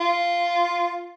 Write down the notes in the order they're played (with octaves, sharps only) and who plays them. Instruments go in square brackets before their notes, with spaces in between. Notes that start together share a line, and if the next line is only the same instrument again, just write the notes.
[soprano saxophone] F4